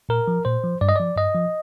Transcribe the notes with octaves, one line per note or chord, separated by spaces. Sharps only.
A#2 A#4
F3
A#2 C5
F3
G2 D5
D#5
F3 D5
G2 D#5
F3